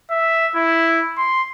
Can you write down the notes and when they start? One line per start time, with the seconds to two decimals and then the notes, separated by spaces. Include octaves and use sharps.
0.10 E5
0.55 E4
1.17 C6